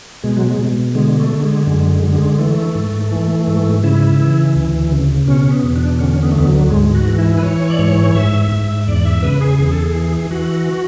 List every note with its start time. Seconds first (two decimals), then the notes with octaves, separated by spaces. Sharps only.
0.23 B2 G#3
0.37 F#3
0.47 G#3
0.59 B2
0.95 D3 G#3
1.19 A3
1.31 D3
1.43 G#3
1.67 F#2 G#3
1.92 G#3
2.03 D3
2.15 G#3
2.39 E3 A3
2.75 G#2
3.11 E3
3.47 G#2
3.83 C#3 E4
4.20 E3
4.56 D2
4.92 C#3
5.27 B2 C#4
5.51 B3
5.63 E2
5.76 D4
5.99 D3 C#4
6.23 B3
6.31 A3
6.36 D2 B3
6.47 F#3
6.71 G#2 G#3
6.95 F#4
7.08 E3
7.19 E4
7.38 B4
7.43 E3 C#5
7.70 D5
7.79 G#2 C#5
8.15 G#2 E5
8.52 G#2
8.87 E2 D5
9.05 E5
9.23 C#3 B4
9.41 G#4
9.59 E2 G#4
9.72 A4
9.83 G#4
9.95 E3
10.31 E3 F#4